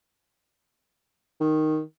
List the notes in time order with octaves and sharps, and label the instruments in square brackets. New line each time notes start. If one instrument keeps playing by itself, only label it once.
[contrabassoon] D#3